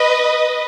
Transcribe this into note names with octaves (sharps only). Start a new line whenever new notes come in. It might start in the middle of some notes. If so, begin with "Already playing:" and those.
Already playing: B4 D#5